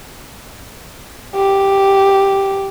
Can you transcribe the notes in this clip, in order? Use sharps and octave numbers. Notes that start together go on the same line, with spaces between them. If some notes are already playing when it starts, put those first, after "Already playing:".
G4